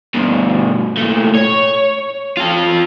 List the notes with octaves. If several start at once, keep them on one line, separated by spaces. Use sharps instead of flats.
G2 B2
A#2 A3
C#5
F4 A4